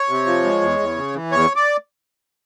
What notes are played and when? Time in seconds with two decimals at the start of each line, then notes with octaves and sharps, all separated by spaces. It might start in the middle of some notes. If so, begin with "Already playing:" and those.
Already playing: C#5
0.09 C3
0.26 F3
0.44 G#3
0.61 E2
0.79 E2
0.96 C#3
1.15 E3
1.32 E2 C#5
1.56 D5